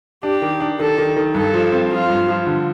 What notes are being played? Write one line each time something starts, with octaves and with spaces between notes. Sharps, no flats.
D4 G4
D#3
D4
D#3 A4
D#3
D#3
G2 A4
F3
C4
F3 F4
G2
F3
D3